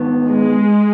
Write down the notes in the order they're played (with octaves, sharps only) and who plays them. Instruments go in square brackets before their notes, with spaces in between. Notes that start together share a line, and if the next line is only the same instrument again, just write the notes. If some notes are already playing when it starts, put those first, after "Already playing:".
Already playing: [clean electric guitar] G#2 D#3 B3
[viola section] G#3